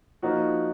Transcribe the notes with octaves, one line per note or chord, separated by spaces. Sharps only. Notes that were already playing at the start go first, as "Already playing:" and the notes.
F3 A#3 D#4 F#4